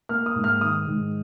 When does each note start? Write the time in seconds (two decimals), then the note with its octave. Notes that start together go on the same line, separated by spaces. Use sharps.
0.09 A#3 F6
0.26 D#6
0.35 G#2
0.44 F6
0.61 D#3 D#6
0.87 G#2